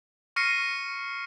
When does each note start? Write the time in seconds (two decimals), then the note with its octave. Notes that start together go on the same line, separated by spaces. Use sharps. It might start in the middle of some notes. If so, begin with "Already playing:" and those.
0.36 C#6 F6 A#6 C7 C#7 D#7